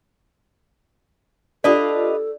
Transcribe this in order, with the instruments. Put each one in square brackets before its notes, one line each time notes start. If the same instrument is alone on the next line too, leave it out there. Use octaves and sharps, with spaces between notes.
[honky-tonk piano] D4 F4 G4 [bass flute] A4 [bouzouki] B4 D#5 F5 [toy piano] D5